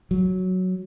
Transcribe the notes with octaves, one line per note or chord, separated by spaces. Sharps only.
F#3